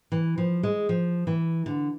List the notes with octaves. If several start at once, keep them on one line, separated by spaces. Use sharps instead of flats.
E3
F3
G#3
F3
E3
D3